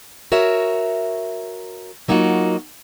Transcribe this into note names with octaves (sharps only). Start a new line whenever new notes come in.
F#4 A#4 C#5 E5
F#3 A#3 D#4 F4 F#4